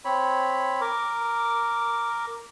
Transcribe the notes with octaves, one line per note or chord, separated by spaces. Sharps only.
C4 C#5 B5
A#4 D6